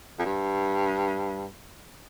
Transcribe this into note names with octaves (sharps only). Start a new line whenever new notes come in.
F2
G2